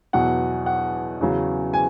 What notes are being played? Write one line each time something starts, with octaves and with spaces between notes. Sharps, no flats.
E2 B2 F#3 F#5
F#5
E2 C#3 F#3
G#5